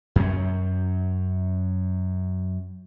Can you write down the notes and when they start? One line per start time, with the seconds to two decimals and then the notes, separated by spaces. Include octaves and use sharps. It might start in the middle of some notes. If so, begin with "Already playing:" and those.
0.16 F#2 C#4